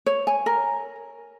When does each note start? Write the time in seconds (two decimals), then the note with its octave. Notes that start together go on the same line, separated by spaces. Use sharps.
0.06 C#5
0.27 G#5
0.46 A#4